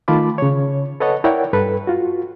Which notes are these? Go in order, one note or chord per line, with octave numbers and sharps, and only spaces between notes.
D#3 A3 F4 A5 B5 D6
C#3 C#5
A4 B4 C#5 D#5 F#5 A5
E4 A#4 C#5 D5 F#5 G5
G2 A4 B4
F4 F#4